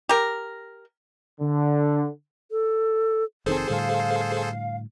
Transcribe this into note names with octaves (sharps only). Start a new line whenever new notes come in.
G4 A#4
D3
A4
F1 D#3 C4 G#4 A4 C5
A2 D3 G3 F5